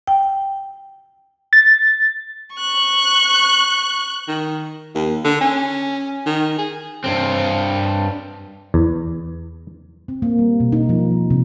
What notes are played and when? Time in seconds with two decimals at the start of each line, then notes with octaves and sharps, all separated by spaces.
0.07 G5
1.53 A6
2.56 C#6 F#6
4.28 D#3
4.95 D#2
5.24 D3
5.41 C#4
6.26 D#3
6.58 G#4
7.04 G2 C4
8.74 E2
10.08 C4
10.22 A#3
10.39 G3
10.60 B2
10.72 D#4
10.89 F3
11.12 A#3
11.30 C3